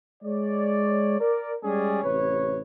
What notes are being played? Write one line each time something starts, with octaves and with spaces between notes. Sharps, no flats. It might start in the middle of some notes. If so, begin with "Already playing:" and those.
G#3 C#5 D5
A#4 D5
G3 G#3 C#4 G4 G#4 D5
A1 C3 B4 C#5